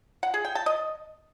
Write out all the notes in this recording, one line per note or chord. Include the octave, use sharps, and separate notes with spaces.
F#5
G#4
G5
A5
D#5